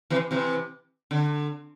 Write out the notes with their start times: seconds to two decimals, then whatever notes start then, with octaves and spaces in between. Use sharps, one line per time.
0.10 C3 E3
0.31 C3 E3
1.11 D3